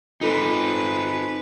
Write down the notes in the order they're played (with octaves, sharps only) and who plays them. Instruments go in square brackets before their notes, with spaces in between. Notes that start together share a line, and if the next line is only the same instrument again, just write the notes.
[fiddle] G#3 B4 [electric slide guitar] C4 D#4 [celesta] F4 A4